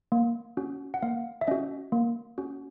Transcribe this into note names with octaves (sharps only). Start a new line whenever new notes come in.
A#3
C#4 F#4
F#5
A#3 F5
E5
C#4 F#4 D#5
A#3
C#4 F#4